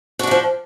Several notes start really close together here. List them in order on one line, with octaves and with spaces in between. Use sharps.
F#4 D4 E3 F3